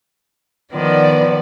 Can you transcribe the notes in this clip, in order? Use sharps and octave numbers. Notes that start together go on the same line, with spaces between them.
D#3 F3 B3 D5